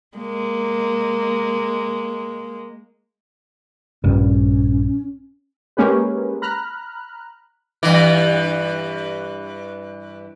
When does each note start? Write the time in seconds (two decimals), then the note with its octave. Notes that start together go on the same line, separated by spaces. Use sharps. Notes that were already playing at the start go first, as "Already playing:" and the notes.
0.17 G#3 A#3
4.04 A#1 G2 C#4
5.77 G#3 A#3 C#4 G4 G#4 B4
6.42 A#5 B5 F6 F#6
7.83 G2 E3